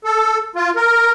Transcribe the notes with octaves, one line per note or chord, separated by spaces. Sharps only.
A4
F4
A#4